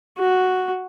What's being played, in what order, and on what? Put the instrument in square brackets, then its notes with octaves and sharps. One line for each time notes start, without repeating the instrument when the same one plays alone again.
[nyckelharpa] F#4